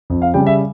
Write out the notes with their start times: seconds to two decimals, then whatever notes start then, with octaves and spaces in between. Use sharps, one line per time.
0.10 F2
0.22 F5
0.34 C#3 G3 G5
0.47 E5